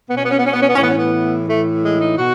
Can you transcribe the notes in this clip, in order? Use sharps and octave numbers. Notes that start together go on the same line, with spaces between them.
B2 B3
C#4
B3
C#4
B3
C#4
B3
C#4
B3
C#4
A2 E3 B3
C#4
B3
A2 E3 A3
G#3
D#4
B2 F#4